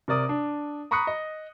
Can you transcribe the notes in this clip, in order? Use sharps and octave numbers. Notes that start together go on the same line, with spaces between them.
C3 A#4 D5 D#6
D4
A#5 B5 C#6 D#6 F#6 C#7
D#5